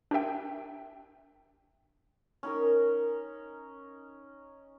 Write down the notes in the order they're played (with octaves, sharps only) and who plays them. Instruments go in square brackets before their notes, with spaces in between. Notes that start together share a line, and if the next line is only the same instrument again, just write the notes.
[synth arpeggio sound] D4 G4 A#4 E5 G5
[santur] C#4 D#4 A#4